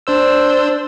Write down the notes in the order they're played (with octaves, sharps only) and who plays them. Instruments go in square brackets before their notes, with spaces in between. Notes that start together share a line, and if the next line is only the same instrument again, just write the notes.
[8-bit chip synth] D4 C5 E6